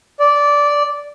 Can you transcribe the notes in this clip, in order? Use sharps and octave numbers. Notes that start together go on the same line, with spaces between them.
D5